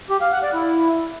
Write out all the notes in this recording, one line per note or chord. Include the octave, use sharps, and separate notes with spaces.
G4
F5
F#5
D5
E4